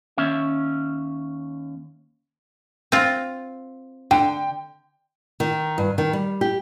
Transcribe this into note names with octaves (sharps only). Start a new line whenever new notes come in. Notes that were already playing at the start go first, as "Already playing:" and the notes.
D#2 C#4 E5
C4 F4
D3 G5
D#3
G2
D#3
G3
G4